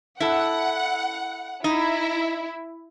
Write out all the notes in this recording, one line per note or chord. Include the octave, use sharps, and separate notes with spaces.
E4 A4 F#5
D#4 E4